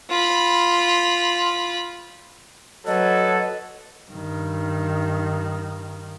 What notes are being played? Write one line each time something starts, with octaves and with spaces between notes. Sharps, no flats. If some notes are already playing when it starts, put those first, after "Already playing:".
F4 B5
F#3 A4 B4 D#5
G2 D#3